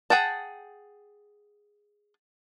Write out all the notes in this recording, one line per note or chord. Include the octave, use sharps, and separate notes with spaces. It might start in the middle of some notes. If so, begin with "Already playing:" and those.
G#4 F#5 G5 A5